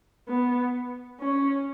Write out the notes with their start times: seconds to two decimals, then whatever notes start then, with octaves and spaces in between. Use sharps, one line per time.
0.28 B3
1.20 C#4